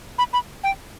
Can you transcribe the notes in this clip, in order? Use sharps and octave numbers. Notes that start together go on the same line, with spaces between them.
B5
B5
G5